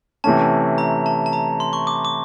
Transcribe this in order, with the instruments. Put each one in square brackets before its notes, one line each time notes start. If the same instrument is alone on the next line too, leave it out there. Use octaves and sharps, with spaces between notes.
[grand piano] C3 E3 A3 C#4 [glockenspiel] A5
[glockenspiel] A#5
A5
A5
A#5
C6
C#6
D6
D6